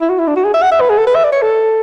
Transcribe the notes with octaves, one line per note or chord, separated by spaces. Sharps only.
E4
F#4
E4
D4
F#4
G#4
E5
F#5
E5
B4
G#4
A4
B4
E5
D5
C#5
A4